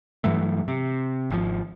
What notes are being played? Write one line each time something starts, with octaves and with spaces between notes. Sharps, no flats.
G2 E3 F#3 A3
C3
G#1 B2 F3